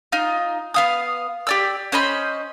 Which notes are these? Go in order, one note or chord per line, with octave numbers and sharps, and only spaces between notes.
D#4 F4
B3 F5 D#6
G4 D5 E6
C#4 C5 D#5 B5